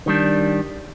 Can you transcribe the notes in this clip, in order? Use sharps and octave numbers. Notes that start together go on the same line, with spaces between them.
D#3 G3 D4